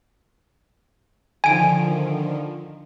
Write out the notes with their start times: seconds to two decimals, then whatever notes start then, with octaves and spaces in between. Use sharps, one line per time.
1.44 D3 D#3 F3 G#5 D7